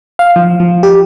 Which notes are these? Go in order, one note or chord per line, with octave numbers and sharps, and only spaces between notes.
F5
F3
F3
G4